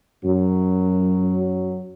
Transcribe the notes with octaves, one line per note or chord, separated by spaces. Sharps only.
F#2 F#3